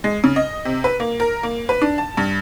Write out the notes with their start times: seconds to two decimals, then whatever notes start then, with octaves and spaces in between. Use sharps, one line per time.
0.04 G#3
0.24 C#3
0.36 D#5
0.65 C3
0.84 B4
1.00 A#3
1.20 A#4
1.43 A#3
1.69 B4
1.82 D4
1.98 A5
2.17 G2